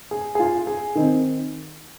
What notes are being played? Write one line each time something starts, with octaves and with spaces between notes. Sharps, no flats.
G#4
G#4
F4
G#4
D#3 C4 D#4